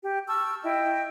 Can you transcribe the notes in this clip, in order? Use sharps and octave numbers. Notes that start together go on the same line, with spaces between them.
G4
A5 C#6 E6 F6
E4 D#5 G5